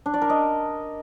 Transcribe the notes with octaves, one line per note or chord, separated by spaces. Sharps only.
D4
D5
A#4
D#5